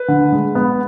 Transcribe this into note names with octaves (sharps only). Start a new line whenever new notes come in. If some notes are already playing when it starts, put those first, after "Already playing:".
Already playing: B4
D3
G#3
B3